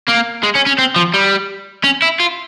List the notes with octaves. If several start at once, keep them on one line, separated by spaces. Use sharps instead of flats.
A#3
G#3
C#4
C#4
C4
F3
G3
C#4
E4
F4